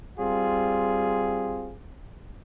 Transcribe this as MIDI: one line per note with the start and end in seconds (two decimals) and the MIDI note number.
0.18 1.74 55
0.18 1.74 60
0.18 1.74 65
0.18 1.74 68